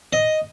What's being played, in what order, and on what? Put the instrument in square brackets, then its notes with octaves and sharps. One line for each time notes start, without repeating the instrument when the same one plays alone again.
[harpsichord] D#5